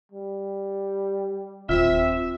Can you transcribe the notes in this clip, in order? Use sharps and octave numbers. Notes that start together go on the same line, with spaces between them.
G3
D#1 C4 F4 E5